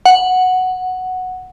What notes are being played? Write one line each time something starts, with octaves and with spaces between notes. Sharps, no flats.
F#5